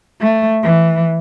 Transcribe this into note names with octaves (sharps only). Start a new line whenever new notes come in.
A3
E3